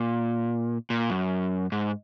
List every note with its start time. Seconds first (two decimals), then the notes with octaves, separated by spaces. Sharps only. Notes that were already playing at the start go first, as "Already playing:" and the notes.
Already playing: A#2
0.90 A#2
1.10 F#2
1.72 G#2